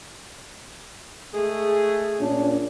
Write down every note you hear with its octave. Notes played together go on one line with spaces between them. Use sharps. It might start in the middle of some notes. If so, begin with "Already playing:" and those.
G#3 A3 G#4
A#2 C#4 D4